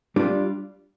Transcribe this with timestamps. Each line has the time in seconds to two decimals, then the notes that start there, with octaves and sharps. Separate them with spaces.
0.16 G3 D4 F4